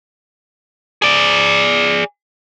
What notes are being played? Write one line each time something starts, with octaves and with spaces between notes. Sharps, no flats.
G#4 D5